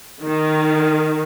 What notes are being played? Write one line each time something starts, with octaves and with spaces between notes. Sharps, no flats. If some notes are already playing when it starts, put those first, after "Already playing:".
D#3